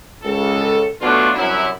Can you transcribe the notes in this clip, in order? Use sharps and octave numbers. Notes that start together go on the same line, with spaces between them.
C#2 C#3 A4
B2 D3 F#3 A3 D4 F4
C2 F#2 F#3 E4